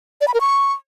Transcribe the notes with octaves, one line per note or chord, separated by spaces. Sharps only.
D5
B5
A#4
C#6